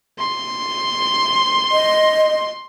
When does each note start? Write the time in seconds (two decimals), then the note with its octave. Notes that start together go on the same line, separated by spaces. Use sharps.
0.19 C6
1.72 D#5